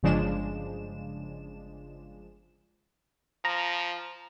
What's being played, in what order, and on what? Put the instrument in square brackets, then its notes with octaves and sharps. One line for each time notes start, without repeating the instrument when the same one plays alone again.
[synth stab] G1 C#3 F3 G#3 D4 E7
[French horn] F3 [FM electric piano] A#5